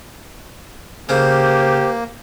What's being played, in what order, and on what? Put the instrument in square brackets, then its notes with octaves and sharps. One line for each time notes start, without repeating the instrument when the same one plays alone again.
[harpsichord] C#3 [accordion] A#3 [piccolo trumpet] G4 [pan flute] C5